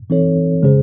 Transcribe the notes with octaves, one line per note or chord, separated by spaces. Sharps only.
E3 C4 D#4 A4 C#5
C#3 G#3 C#4 G#4 C5